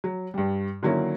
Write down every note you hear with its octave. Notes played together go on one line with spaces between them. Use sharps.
F#3
G2 G3
D3 D#3 F#3 A#3 C#4 E4